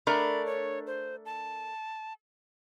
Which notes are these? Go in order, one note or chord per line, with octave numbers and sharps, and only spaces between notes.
A3 D4 A#4 B5
C#5
C5
A5